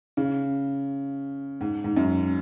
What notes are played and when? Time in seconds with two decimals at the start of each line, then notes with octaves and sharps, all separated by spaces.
0.17 C#3
1.61 G#2
1.84 G#2
1.97 F#2